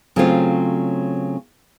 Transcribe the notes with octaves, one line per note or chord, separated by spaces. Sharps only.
C#3 F#3 A3 C4 F4